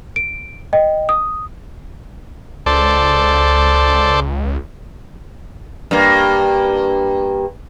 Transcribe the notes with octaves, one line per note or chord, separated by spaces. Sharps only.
D7
D#5 G5
D#6
C#2 A4 C5 D5
G2 A#3